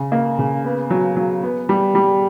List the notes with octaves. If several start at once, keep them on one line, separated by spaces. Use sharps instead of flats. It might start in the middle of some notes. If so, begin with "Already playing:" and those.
Already playing: C#3
A#3
C#3
B3
F#3
F#3
B3
G3
G3